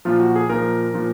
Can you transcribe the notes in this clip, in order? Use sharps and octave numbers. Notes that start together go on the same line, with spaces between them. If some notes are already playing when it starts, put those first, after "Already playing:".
A#2 F3 F4
F#4
G#4
A#2 F3 A#4
A#2 F3